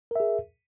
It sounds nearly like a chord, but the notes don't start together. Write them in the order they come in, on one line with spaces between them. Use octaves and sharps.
A#4 E5 G#4